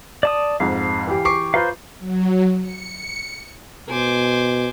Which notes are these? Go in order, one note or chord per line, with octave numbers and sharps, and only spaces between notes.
D5 A5 D#6
F2 G#2 F5
E3 G4
C#6 D6 C7
F4 B4 C5 F5 A#5
F#3
C#7
B2 C5 G#5 D6